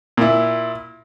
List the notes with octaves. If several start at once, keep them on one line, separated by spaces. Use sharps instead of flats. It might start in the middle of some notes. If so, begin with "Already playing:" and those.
A#2 E4